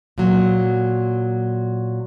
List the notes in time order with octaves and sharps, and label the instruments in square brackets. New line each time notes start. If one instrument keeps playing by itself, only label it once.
[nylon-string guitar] A#2 F#3